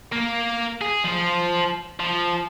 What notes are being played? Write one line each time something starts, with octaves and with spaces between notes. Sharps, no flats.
A#3
G#4
F3 C5
F3